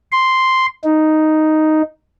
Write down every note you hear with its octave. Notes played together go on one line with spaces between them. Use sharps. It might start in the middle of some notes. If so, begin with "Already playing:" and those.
C6
D#4